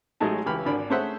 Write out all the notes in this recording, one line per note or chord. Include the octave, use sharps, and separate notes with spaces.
A1 F#3 G#3 A3 D#4 A5
C#2 E3 G4 B5 F6
G#1 D3 D4 A#4 B5
A3 C#4 G#4 C5 E5 F#5